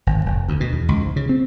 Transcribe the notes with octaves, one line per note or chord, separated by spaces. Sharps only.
G#1
F1
D2
B2
E2
C#2
G#2
C#3
C4